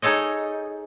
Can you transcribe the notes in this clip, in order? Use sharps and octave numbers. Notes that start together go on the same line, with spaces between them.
D#4 G#4 A4 C#5 D#5